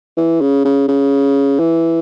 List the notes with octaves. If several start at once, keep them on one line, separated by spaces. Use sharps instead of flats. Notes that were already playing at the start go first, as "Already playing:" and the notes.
E3
C#3
C#3
C#3
E3